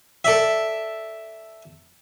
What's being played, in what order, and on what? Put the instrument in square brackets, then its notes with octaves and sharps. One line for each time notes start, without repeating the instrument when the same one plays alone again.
[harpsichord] A4 D5 E5